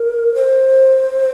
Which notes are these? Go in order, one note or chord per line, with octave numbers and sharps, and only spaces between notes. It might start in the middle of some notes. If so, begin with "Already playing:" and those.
Already playing: A#4
C5